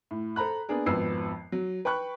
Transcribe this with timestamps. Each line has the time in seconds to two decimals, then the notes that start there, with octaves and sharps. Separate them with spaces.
0.11 A2
0.36 A4 C5 A#5 B5 F#6
0.69 A#3 B3 D4 G#4 A#4
0.86 G#1 F2 B3 B4 E6 C7
1.52 F#3
1.85 B4 G5 B5 C#6 F#6